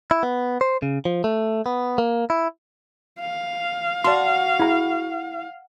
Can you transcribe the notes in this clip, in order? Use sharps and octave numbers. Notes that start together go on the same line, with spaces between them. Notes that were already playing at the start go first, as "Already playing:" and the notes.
E4
B3
C5
C#3
F3
A3
B3
A#3
E4
F5
F#4 D5 A5 C6
E4 G#4 A#5